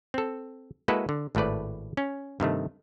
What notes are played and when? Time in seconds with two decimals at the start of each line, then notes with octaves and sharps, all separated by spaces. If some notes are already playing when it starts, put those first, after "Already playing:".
0.14 C4 A4
0.88 G#3 A#3 E4 F#4 A4 B4
1.09 D3
1.35 G#1 A2 A3 B4 D5
1.97 C#4
2.40 G2 C3 D#3 A3